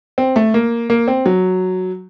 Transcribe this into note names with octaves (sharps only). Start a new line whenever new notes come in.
C4
A3
A#3
A#3
C4
F#3